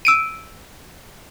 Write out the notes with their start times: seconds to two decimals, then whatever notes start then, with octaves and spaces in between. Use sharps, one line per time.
0.05 E6 D7 D#7